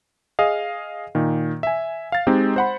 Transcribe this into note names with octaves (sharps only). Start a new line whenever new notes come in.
G#4 D#5 F5
A#2 D#3
E5 G#5
F5 A6
G#3 C4 D#4 G4
C5 F#5 B5